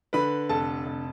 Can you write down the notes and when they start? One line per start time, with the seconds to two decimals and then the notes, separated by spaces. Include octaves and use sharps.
0.13 D3 B4 B5
0.49 F1 A4 A5
0.85 F1